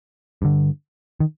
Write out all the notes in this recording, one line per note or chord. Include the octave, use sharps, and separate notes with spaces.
G2 D3
D#3